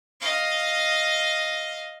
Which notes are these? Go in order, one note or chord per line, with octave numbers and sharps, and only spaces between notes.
D#5 F5